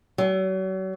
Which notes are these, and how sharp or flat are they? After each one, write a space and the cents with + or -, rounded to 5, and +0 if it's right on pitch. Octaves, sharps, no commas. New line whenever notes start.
F#3 +40